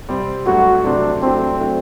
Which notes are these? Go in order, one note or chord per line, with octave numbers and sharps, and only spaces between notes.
C3 G3 C4
G2 F#3 A3 F#4
C3 F#3 A3 C4 D4
C3 F#3 A3 C4 D4
F#3 A3 D4